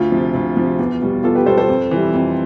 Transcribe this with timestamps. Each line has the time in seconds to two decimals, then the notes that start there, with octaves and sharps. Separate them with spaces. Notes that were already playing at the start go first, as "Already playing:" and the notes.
Already playing: D2 F4
0.12 C3 F3
0.34 D2
0.57 C3 F3
0.79 E2
1.02 B2 G3
1.23 E2 F4 A4
1.35 G4 B4
1.46 B2 G3 A4 C5
1.57 A4 C5
1.69 F2
1.91 E3 G3
2.14 F2